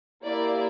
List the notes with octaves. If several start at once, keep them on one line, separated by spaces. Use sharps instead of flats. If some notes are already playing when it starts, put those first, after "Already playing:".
A#3 E4 G4 D5